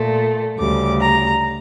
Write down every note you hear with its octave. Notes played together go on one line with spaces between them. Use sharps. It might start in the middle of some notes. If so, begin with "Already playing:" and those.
Already playing: A#2 A3
D2 C#3 G3 D6
A#5